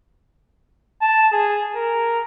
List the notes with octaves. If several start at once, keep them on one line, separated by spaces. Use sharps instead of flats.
A5
G#4
A#4